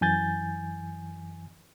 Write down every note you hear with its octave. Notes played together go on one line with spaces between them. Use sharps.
F#2 E3 G#5 G6 A6